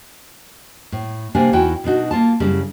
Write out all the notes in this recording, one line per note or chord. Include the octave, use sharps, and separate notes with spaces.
A2
C3 A#3 D4 G4 G#5
E2 D#4 E4 F#4 G5 G#5
B2 D4 D#4 F#4
A#3 F4 A5
F#2 C#3 G3 E4